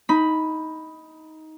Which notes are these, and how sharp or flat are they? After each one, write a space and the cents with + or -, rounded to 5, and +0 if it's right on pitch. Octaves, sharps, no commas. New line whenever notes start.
D#4 +15 B5 +0